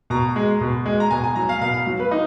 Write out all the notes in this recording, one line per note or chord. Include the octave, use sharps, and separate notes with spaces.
B2 A#5
G#3
B2
G#3
A#5
B2 G#5
G#5
F#3 A#5
F5
B2 F5
F5
F#3
B4
D#4